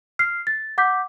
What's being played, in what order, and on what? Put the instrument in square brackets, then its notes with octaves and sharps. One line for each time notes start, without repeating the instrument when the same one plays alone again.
[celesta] F6 C7
A6
F#5 D6 G6 B6